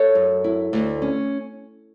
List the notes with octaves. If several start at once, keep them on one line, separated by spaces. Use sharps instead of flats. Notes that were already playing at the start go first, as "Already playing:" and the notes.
Already playing: A4 C#5
F#2
E4
D2
C#4